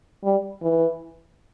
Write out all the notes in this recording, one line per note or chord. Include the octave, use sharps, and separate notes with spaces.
G3
E3